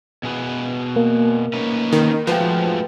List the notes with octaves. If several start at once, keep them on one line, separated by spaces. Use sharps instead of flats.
B2 G#4 B4
A#3
C#4 D#4 B4
D#3
F3 G#3 A3 F#4 B4 G5